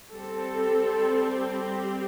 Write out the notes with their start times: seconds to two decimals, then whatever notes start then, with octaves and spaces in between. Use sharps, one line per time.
0.11 G3 C4 A4
1.50 G4